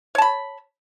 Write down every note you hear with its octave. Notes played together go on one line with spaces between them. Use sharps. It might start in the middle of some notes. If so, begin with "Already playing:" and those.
C#5 A5 B5